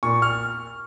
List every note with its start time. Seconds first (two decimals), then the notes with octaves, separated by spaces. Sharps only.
0.03 A#2 C#6
0.22 F6